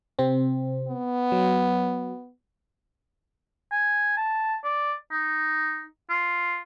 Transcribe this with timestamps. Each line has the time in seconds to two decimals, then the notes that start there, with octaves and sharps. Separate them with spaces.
0.19 C3 C4
0.88 B3
1.32 F#3
3.72 G#5
4.17 A5
4.64 D5
5.11 D#4
6.10 F4